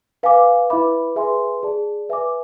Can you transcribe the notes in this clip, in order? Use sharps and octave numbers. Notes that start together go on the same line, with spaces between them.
B4 F5 G#5 D6
E4 B4 E5 B5 D6
G#4 B4 E5 G#5 C6
G#4 D5 A5
B4 E5 G#5 D6